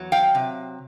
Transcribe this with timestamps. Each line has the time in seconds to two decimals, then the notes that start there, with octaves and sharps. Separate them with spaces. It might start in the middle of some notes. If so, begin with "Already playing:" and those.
Already playing: E2 F#3
0.12 F5 G5
0.35 C3